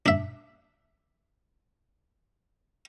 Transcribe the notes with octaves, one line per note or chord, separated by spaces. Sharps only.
D4 E5